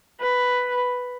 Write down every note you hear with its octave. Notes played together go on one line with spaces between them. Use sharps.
B4